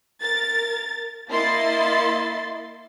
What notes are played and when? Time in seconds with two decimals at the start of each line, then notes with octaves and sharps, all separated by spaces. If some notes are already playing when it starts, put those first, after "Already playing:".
0.21 A#4 A6
1.29 A#3 E4 D#5 C6 A6